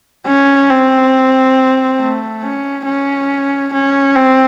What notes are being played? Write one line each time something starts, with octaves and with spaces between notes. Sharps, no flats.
C#4
C4
A3
C#4
C#4
C#4
C4